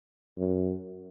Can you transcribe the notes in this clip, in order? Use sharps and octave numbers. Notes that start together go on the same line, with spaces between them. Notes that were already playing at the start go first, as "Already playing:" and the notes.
F#2